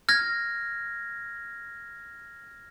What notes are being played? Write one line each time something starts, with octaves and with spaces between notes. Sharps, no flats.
F6 G#6 A#6